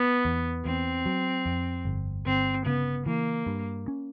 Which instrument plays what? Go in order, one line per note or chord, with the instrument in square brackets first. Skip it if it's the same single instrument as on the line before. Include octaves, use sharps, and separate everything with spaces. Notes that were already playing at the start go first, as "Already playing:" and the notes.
Already playing: [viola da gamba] B3
[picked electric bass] E2
[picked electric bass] E2 [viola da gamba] C4
[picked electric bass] F#3
F2
G1
[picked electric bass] G1 [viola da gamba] C4
[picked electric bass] C#3 [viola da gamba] B3
[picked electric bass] E3 [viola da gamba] A#3
[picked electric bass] G2
C#4